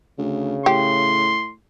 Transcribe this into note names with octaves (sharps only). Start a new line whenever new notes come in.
D2 C#3
A2 G4 C6